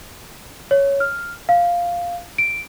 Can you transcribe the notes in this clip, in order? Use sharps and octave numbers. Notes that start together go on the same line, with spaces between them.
C#5
F6
F5
D7